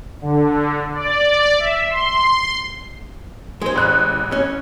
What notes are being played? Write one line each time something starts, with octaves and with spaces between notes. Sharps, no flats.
D3
D5
E5
C6
G#3 C5
A1 F#6
C#4